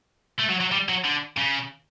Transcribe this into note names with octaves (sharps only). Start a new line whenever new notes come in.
A3
F#3
F#3
G3
F#3
D3
C#3